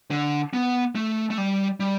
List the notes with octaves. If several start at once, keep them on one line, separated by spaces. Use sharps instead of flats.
D3
B3
A3
A3
G3
G3